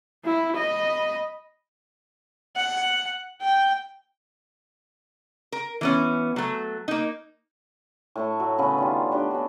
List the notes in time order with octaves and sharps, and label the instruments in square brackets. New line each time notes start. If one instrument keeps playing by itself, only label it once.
[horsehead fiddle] E4
D#5 B5
[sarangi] F#5
G5
[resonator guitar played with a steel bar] A#4
E3 B3 C#4
F#3 A3
A#3 D#4
[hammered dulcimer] A2 A3 C#6
F#3 F#4
C#3 B3 C#4 B4
D#3 G3 F4
A3 D4 F#4 G4
B3 C#4 F#4